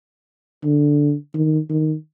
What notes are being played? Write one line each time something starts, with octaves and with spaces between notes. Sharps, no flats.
D3
D#3
D#3